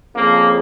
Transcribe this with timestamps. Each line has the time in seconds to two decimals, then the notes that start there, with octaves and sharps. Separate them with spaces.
0.15 F2 C#3 F3 A#3